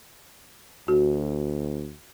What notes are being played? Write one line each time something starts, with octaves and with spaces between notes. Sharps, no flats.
D2 F#4